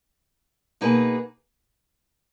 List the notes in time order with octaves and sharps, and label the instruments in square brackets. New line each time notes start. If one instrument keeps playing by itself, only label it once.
[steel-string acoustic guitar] B2 A#3 D#4 G#4 B4